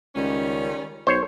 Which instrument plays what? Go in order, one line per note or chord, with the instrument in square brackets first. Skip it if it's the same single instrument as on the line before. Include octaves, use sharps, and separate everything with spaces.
[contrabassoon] C#2 [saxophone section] D#3 G3 C#4
[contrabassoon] B1 [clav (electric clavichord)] C5 C#5